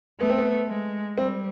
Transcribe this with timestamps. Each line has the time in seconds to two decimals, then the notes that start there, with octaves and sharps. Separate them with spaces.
0.20 A3 B3
0.30 C4
0.38 B3
0.68 G#3
1.17 G3 C4